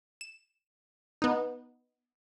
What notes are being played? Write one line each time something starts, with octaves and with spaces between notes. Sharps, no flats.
E7
B3 D#4